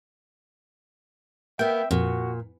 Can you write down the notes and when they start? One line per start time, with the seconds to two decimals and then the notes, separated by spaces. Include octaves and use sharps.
1.59 A#3 B3 E5 G5
1.91 F2 A#2 F#4